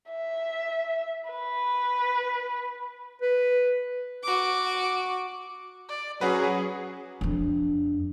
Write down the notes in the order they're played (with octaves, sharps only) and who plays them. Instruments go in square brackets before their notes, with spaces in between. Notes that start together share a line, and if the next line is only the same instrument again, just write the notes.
[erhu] E5
B4
[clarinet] B4
[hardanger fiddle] F#4 D6
[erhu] D5
[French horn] F#3 [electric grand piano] C#4 F#4 B4 [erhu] G#4
[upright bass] F2 D4